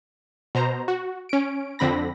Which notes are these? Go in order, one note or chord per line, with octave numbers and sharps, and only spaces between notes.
B2 C5 A#5
F#4
C#4 D7
F2 D3 C4 B5 A#6